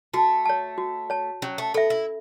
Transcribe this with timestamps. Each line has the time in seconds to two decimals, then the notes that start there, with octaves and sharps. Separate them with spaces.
0.14 A3 F#4
0.46 C#5 A5
0.78 F#4
1.10 C#5 A5
1.42 F#3 C#4
1.58 A3
1.74 B3 A4 E5
1.90 E4